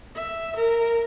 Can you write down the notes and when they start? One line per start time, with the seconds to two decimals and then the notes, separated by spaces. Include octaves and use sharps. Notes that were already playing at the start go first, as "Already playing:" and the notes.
0.16 E5
0.56 A#4